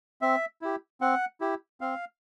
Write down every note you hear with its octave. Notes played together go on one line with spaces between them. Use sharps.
C4 E5
E4 G4
C4 F#5
E4 G4
C4 F5